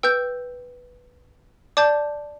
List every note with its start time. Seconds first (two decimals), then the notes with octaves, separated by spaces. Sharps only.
0.03 B4 G5 E6 G6
1.77 D5 A5 D6 G6